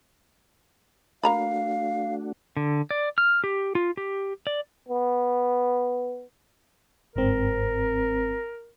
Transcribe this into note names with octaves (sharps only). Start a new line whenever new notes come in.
A3 A#3 D4 F#4 F5 A#5 B5
D3
D5
F6
G4
F4
G4
D5
B3
G1 G#2 C4 A#4